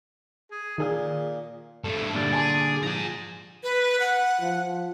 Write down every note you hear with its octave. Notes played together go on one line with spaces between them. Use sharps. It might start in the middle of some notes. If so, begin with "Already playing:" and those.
G#4
A#2 D#3 G#4 D#6
G2 A3 A4
A#2 D3 G3 D5
G#4 G#5 A5 C6
F3 G#5 A#5
B4
F#5
F3